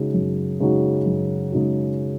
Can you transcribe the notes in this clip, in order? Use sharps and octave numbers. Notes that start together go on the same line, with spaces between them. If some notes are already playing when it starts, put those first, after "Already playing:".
Already playing: C#3 G#3 D#4 F#4
F#2
C#3 G#3 D#4 F#4
F#2
C#3 G#3 D#4 F#4